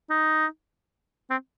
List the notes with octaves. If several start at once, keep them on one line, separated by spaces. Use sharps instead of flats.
D#4
C4